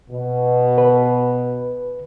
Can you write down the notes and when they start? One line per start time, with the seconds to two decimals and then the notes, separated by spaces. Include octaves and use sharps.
0.10 B2
0.78 B4